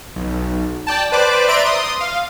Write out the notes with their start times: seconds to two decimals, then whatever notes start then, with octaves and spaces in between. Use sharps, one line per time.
0.16 B1
0.87 D5 G5 A5
1.12 B4 C5 D5 D6
1.48 D5 E5 A#5 C6 D7
1.65 C6 D#6
2.00 F5